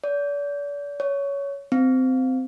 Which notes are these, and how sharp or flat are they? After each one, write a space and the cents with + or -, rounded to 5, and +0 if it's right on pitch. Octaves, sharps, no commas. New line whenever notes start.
D5 -40
C#5 +15
C4 -20